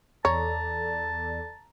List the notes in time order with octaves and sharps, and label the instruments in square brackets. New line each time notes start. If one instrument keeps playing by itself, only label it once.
[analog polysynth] E2 A4 D5 [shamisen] C#5 [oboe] A5 [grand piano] A#5